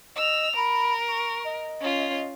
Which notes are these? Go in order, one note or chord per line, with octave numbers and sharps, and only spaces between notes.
D#5 E6 F7
A#4 B5
C#6
D#5
C#4 F4